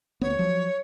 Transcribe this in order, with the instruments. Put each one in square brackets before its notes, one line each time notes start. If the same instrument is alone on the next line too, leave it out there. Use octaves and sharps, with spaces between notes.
[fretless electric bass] D2 B3 [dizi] C#5
[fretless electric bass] F3 F#3